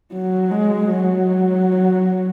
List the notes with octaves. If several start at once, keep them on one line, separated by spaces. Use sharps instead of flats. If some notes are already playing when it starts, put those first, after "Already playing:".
F#3
G#3
F#3